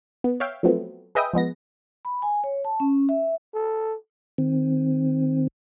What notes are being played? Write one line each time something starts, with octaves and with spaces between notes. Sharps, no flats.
B3
C#5 E5 F5 G5
F3 F#3 A3 B3 C4
G#4 B4 D#5 E5 G5 D#6
F3 G#3 B3 A#6
B5
G#5
C#5
A5
C#4
E5
A4
D#3 C4